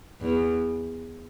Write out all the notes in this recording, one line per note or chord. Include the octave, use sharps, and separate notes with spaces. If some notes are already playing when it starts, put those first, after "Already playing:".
E2